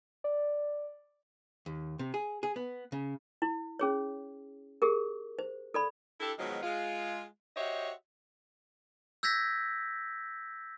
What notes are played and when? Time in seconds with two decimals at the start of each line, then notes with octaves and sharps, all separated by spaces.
0.24 D5
1.66 D#2
1.99 C3
2.14 G#4
2.43 G#4
2.56 B3
2.92 C#3
3.42 E4
3.79 C#4 G#4 C#5
4.82 G4 G#4 A#4
5.39 C5
5.74 A4 D5 B5
6.20 D4 E4 G4 A4
6.39 B2 D#3 F3 F#3 G#3
6.62 G#3 F4
7.57 F#4 G4 C5 C#5 D#5 E5
9.23 E6 G6 G#6 A#6 B6